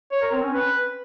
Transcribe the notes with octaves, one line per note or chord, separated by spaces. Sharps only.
C#5
A#4
C4
C#4
B4